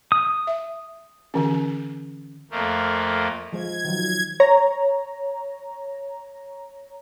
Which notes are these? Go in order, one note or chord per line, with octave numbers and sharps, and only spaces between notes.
D#6
E5
D3 E3 C#4
F2 A3 A#3
F3 G#3 C5 G#6
D#3 F3 F#3
C#5 A#5